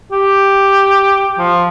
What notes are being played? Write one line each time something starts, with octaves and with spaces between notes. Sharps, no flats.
G4
F3